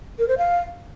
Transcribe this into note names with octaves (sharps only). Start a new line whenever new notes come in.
A#4
C5
F5